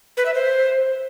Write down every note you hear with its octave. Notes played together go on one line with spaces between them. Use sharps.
B4
E5
C5